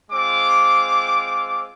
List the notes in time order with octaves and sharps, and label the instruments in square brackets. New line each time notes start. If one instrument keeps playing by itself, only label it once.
[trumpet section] G#3 C4 F4 D6